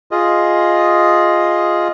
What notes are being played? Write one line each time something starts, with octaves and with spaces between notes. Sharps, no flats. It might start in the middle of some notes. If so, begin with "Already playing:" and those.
F4 G#4 D#5